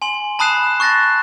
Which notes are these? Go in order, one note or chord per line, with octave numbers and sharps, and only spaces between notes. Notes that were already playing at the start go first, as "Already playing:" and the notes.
G#5 C6 F#7
A5 B5 D#6 F#6 C7 E7
C#6 F#6 A6 A#6 C7